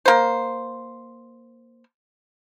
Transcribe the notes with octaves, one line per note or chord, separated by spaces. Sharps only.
A#3 C5